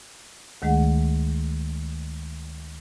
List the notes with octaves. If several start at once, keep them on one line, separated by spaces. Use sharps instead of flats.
D2 D#3 G#3 A3 G#4 F#5